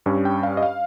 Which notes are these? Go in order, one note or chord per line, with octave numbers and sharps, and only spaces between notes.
G2 G3 C#4
G5
F5
D#5
F5